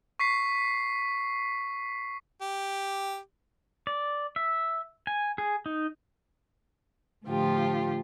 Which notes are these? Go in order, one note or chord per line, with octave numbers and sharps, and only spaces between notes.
C#6 B6 C7
G4
D5
E5
G#5
G#4
D#4
A2 D3 F3 F4 G4